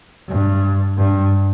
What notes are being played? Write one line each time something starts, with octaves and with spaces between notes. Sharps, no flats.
G2
G2